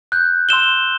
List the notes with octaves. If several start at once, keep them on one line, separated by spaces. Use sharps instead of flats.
F#6 G6
C6 E6 E7 G7